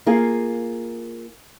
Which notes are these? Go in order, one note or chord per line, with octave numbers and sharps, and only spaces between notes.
A#3 F4 G#4